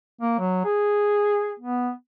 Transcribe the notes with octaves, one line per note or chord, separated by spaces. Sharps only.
A#3
F#3
G#4
B3